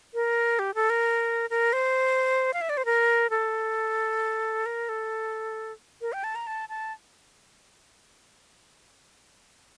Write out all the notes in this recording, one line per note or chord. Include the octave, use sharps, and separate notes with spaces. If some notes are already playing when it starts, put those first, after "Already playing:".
A#4
G4
A4
A#4
A#4
C5
F5
E5
D5
C5
A#4
A4
A#4
A4
A#4
G5
A5
A#5
A5
A5